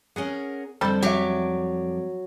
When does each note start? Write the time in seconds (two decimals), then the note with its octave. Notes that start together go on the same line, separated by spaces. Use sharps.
0.16 C#4 G#4 A#4 F#5
0.81 F2 D3 G3 A4 C5 A5
1.03 F2 F#3 G4 D5 E5